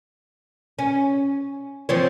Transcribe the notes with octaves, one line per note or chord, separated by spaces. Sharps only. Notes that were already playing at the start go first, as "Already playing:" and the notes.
C#4
F3 C4 C#5